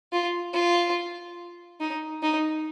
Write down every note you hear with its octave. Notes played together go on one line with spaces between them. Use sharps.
F4
F4
D#4
D#4